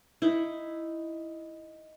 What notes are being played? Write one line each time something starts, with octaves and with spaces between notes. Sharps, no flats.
D#4 E4